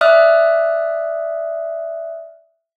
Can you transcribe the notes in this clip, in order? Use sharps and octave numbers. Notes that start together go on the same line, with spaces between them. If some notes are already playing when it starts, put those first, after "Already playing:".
D5 E5 D#6 F6 F#6